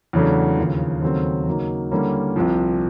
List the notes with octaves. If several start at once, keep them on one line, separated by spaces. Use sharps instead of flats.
E2 C#3 F#3 A3 D4
D#2 C#3 F3
D#2 C#3 F#3 A3 C4
C#3 F#3 A#3 D#4
D3 G3 A#3 C#4 E4
C2 C3 F3